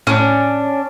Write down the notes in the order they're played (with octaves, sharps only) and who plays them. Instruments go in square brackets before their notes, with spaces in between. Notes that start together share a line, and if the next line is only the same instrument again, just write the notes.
[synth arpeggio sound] A2 [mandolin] C#4 D4